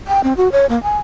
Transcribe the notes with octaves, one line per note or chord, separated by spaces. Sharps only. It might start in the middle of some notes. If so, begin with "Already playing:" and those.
G5
C4
F#4
C#5
A#3
G#5